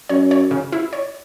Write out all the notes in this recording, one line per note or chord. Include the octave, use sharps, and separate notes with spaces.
F#2 C#5
C#5
C#3
E4
C#5